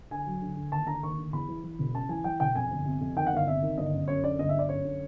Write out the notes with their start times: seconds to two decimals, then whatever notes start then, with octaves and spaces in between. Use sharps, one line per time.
0.11 D3 G#5
0.27 F#3
0.42 D3
0.57 D3
0.72 D#2 A5
0.87 D3 A#5
1.03 D#2 C#6
1.17 D3
1.33 E2 B5
1.48 E3
1.64 E3
1.79 E1
1.94 C#3 A5
2.09 E3 G#5
2.24 E3 G5
2.40 E1 G5
2.55 F2 G#5
2.70 G1
2.86 C3
3.01 F2
3.16 D#3 G5
3.27 F#5
3.32 G1 F5
3.47 C3 E5
3.62 D#3
3.77 G1 D#5
3.93 F#2
4.08 F#2 C#5
4.24 D3 D5
4.38 G1 D#5
4.49 E5
4.54 D3 D5
4.69 F#2 C#5
4.85 D3